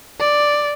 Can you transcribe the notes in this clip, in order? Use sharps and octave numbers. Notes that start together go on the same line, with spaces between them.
D5